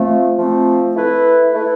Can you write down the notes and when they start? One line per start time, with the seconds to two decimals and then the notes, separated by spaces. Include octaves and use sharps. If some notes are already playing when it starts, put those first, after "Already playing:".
Already playing: F3 A3 C4
0.37 F3 A3 C4
0.95 A3 E4 B4
1.52 A3 E4 B4